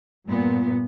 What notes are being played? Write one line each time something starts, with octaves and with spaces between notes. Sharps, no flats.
G2 A#2 B3